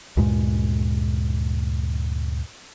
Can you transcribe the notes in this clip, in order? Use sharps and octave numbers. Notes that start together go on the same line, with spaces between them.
D2 G2 A#2 G#3